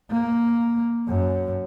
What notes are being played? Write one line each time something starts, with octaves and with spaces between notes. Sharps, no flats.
A#3
F#2